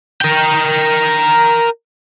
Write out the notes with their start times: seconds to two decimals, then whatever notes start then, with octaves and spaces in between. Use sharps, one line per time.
0.21 A#4 G5